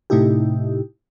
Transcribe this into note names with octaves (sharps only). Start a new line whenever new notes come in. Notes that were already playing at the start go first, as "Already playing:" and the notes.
A2 C3 A3 D#4 E4 G4